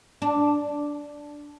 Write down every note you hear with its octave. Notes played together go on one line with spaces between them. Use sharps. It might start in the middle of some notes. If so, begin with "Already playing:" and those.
D4